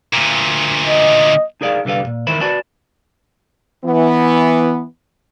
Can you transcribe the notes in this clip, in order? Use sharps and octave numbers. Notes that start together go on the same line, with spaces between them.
D2 A#2
D#5
D#4 G#4 A#4 D5 E5 F5
C2 D3 G3 B4 F5
B1 A#2
E2 D#3 E4 A#4 C5 B5
F#4 B4 D5 G#5 A5 B5
E3 B3